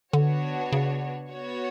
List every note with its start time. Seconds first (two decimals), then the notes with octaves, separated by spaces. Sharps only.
0.13 D3 B3 D4 F#4 C#5
0.72 C#3
1.31 B3 F#4 C#5